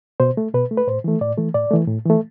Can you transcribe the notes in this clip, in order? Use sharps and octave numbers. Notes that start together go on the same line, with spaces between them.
B2 C5
A3
B2 B4
A3
B4
A2 C5
E3 A3
A2 D5
E3 A3
A2 D5
E3 A3
A2
E3 A3